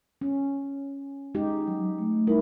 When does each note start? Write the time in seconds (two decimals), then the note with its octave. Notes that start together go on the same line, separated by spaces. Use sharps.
0.21 C#4
1.35 G#3 D#4 G4
1.67 F#3
1.98 A3
2.27 G3 D#4 E4 A#4